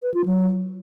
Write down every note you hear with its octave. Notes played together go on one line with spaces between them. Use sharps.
B4
F4
F#3